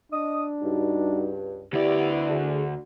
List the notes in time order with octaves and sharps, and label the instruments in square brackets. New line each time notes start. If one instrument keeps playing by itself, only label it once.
[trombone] D4 [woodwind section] D#5 D#6
[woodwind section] C#2 G2 [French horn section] G3 D#4 F#4
[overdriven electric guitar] D2 D5 [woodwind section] B3 E4 [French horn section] G4
[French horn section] D3 G#4 [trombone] F#4